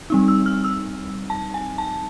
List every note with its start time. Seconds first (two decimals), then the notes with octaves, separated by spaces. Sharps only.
0.10 G3 C4 D#4
0.28 E6
0.46 F6
0.64 E6
1.30 A5
1.54 G#5
1.78 A5